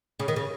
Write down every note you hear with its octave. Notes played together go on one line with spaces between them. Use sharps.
C#3
D#3
C#3